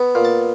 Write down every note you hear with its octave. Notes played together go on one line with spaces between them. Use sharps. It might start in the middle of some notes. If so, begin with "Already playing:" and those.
Already playing: B3
A#2
A5